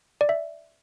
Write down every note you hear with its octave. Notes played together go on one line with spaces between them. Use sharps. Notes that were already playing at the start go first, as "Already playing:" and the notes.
D5
E5